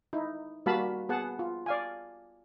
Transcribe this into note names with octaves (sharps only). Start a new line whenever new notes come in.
D#4 E4
G3 A#3 F#4 F5 A5 B5
B3 G#4 F#5 A5
F4
D5 F5 G#5